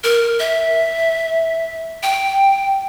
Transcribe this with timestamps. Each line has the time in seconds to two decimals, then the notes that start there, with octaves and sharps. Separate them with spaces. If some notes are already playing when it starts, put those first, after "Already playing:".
0.04 A#4
0.40 E5
2.03 G5